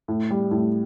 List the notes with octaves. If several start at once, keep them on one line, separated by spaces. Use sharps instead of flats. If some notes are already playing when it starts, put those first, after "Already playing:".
A2
G3
A2